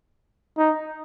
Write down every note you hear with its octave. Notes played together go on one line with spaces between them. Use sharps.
D#4